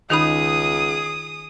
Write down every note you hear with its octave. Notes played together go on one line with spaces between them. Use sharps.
C#2 D#3 D#4 G#4 B5 D#6